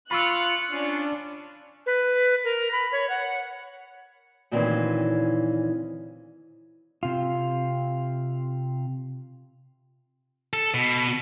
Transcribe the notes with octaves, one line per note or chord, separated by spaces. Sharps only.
F4 B5 C#6 E6 F#6 C#7
C#4 D4 F4
B4
A#4
B5
C#5
F#5
D2 A#2 D#3 E3 C4 C#4
C3 F4
A4
B2